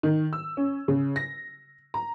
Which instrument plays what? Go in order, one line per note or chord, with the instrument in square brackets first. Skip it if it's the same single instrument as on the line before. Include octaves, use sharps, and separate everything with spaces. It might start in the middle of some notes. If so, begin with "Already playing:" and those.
[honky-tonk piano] D#3
E6
C#4
C#3
A#6
A#5